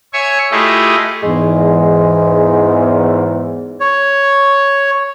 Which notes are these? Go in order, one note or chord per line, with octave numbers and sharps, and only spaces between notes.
C#5 E5 G#5 C#6
A3 E4 F4 G4 G#4 D#5
E2 G#2 G#3
C#5